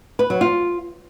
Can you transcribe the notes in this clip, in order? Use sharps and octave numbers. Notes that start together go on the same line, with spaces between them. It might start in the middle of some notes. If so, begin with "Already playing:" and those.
B4
F#3
F4